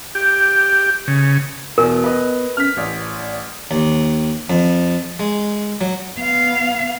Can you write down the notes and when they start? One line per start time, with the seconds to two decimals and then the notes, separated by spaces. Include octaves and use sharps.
0.15 G4
1.08 C#3
1.78 E2 B2 B3 A#4
2.04 B4 D#5
2.57 C#4 F6 B6
2.77 A1 D5
3.71 D#2
4.50 F2
5.19 G#3
5.81 F#3
6.17 B3 F5